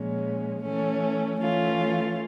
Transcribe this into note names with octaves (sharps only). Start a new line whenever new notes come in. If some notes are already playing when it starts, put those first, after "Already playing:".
Already playing: A#2 F3 G#3 C#4
E3 A3 C#4
E3 A3 C#4 F4